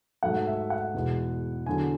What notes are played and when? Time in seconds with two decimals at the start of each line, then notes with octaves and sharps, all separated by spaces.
0.23 G#2 F#3 A3 F#5
0.47 E5
0.70 F#5
0.94 E2 B2 G#3
1.66 E2 D3 F#3 G#5